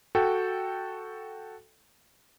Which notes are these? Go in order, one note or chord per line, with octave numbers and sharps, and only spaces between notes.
F#4 A4 G5